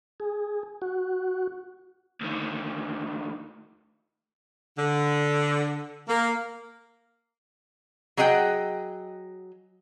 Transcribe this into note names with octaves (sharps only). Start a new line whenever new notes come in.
G#4
F#4
D2 D#3
D3
A#3
F#3 G#4 D#5 F#5 G5